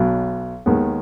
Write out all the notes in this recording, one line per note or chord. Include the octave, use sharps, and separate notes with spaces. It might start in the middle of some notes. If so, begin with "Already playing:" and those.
Already playing: B1 B2 F#3
D#2 D#3 G#3 B3